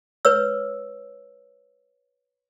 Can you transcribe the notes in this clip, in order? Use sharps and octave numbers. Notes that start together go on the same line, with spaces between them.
B4 C#5 E6